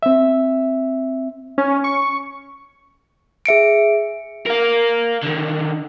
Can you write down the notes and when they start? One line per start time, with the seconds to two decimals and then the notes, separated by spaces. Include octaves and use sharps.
0.03 C4 E5
1.58 C#4
1.84 C#6
3.46 G#4 E5 C#7 D7
4.47 A#4 F5
5.23 D3 D#3